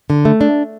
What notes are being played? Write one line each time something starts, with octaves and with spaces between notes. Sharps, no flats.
D3
A3
D4